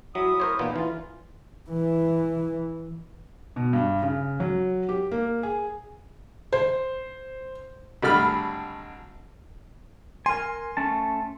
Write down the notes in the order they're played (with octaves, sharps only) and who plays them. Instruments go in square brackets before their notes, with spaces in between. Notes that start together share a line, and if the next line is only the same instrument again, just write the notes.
[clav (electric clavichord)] F#3 [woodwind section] E4 E5 D#6
[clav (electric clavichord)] A#4 C5 C#5
[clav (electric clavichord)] A#2 B3 F4 [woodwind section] E3 D#4
[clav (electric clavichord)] E3 [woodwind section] F4
[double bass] E3
[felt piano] B2
G2
C#3
F#3
G4
A#3
G#4
C5
[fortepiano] G#1 D3 G3 A3 B5 F6
[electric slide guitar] A#4 G#5 [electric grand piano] C6
[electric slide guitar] A3 C#4 A5